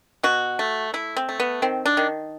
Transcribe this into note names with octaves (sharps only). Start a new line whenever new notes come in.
B2 F#4
A3
A3 E4
C4
A3
B3
D#3 C4
D4
D#3